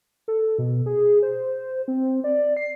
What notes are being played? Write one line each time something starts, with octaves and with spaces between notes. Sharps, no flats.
A4
B2
G#4
C5
C4
D5
C7